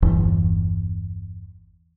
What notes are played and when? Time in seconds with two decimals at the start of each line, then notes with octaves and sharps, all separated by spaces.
0.02 G1 E2